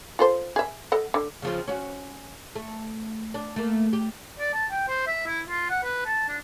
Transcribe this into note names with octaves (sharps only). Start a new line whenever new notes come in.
F4 A4 C5
G#4 E5
A4 D#5 F#5
D3
C#3 F3 C4
C#4 F#4
A3
D4
A3 A#3
G4
D5
A5
G5
C5
E5
E4
F4
F#5
B4
A5
D4